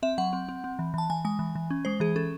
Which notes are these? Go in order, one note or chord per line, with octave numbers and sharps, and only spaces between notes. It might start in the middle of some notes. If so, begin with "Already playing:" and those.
C4 E5
F#3 F#5
C4
C4
C4
E3
E3 A5
E3 G#5
G#3 G#5
E3
E3
C#4
G#3 C5
E3 G#4
C#4 A4